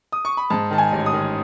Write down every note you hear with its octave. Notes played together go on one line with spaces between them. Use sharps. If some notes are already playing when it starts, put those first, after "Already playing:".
D#6
C#6
B5
G#2 A5
D#3 A5
G#5
A1
D#6
D#3